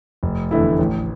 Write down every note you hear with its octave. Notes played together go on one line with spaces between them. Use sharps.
F1
E2 D3 A3 E4
A1